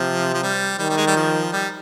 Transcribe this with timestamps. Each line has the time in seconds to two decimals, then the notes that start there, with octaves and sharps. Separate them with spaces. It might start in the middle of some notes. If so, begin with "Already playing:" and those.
Already playing: C3 F3
0.34 F3
0.43 G3
0.79 D#3 G3
0.89 G3
0.97 G#3
1.07 G3
1.16 F3
1.53 G3